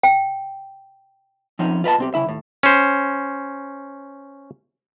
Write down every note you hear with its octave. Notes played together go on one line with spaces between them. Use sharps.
G5
F3 C4 C#4 D#4
F4 B4 D#5 A5
B1 C4 G4
C#3 E4 E5
D#2 A2
C#4 C5